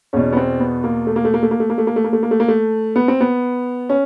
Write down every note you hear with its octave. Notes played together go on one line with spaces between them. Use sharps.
E2 B2 C#4
B3
C4
B3
A#3
A3
A#3
A3
A#3
A3
A#3
A3
A#3
A3
A#3
A3
A#3
A3
A#3
A3
A#3
A3
B3
C4
B3
C#4